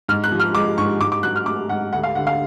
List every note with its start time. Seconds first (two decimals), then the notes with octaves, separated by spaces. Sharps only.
0.09 G#2 F6
0.24 F#6
0.31 F3
0.40 F6
0.55 G#3 D6
0.78 G#2 C#6
1.00 G#2 D6
1.12 D6
1.23 F#3 F#6
1.36 F6
1.46 A3 D6
1.69 G#2 F#5
1.93 D2 F#5
2.03 F5
2.15 D3 F#5
2.27 F5